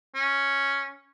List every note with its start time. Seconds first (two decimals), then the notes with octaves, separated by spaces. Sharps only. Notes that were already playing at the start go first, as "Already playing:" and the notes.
0.15 C#4